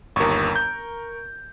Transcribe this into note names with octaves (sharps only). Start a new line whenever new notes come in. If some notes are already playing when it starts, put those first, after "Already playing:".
G1 D#2 A#4 C#6
G6